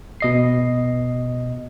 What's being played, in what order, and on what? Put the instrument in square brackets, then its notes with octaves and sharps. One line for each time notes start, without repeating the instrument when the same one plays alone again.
[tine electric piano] B2 D#5 C7